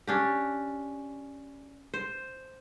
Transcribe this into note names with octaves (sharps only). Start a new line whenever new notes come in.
C#4 D4 G4
C5